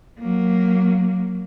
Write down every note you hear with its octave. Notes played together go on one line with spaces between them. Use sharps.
F#3 A#3